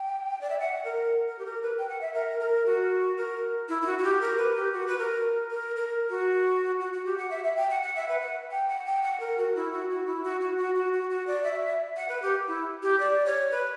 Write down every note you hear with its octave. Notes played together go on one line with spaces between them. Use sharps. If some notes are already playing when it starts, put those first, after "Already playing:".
Already playing: G5
D5
E5
F#5
A#4
A#4
G4
A#4
B4
G5
F#5
E5
A#4
A#4
F#4
A#4
E4
E4
F#4
F#4
G4
A#4
B4
G4
F#4
B4
A#4
A#4
A#4
F#4
F#4
F#4
G4
F#5
E5
E5
G5
F#5
F#5
E5
B4
F#5
G5
F#5
G5
F#5
A#4
F#4
E4
F#4
F#4
E4
F#4
F#4
F#4
F#4
F#4
F#4
D5
E5
F#5
B4
G4
E4
G4
D5
C#5
B4